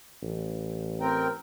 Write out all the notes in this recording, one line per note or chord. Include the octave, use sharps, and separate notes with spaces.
A1
C4 A#4 G5